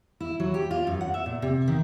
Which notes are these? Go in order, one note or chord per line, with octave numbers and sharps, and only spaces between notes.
E4
F#3
G4
F4
F#2
F#5
E5
A#2
C3
D#3